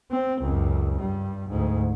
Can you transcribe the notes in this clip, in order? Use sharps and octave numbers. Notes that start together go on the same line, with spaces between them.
C4
C#2 F#2
G2 G3
D2 G#2